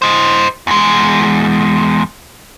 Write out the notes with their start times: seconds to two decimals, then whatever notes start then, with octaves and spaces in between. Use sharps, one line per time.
0.02 C5 D#5
0.67 E2 G#3